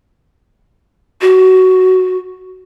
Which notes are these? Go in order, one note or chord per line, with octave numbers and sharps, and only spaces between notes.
F#4